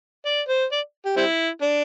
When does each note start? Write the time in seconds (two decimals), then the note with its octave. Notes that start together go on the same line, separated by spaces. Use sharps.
0.25 D5
0.48 C5
0.72 D5
1.05 G4
1.16 G3 C4 E4
1.62 D4